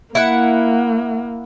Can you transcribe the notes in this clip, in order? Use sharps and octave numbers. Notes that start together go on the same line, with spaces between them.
A#3 E4 F#5